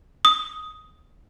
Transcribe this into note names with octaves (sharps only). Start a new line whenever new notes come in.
D#6